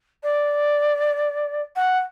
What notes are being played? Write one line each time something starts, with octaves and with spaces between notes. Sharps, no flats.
D5
F#5